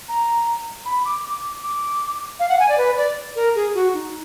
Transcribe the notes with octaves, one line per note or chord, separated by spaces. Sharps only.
A#5
B5
D6
D6
D6
F5
F#5
G#5
D5
B4
D5
A#4
G#4
F#4
D#4